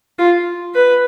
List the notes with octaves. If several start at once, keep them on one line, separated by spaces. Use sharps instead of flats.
F4
B4